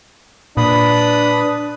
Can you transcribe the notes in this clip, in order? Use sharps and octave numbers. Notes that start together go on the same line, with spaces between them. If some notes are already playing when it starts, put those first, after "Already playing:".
A#2 D4 B4 B5 D#6